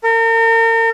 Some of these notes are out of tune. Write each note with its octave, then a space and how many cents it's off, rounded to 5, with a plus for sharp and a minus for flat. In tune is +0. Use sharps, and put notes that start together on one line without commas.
A#4 -40